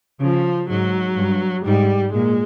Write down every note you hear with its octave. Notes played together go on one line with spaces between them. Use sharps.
C#3 F3
G#2 F#3
G2
G#2 G3
A#2 G#3